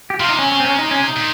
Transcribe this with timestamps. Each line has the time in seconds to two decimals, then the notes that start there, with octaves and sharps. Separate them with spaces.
0.10 G4
0.20 C3 F4
0.29 D#4
0.39 C#4
0.52 C#4
0.60 C4
0.65 C#4
0.79 D#4
0.91 C#4
1.04 D#4
1.16 A#2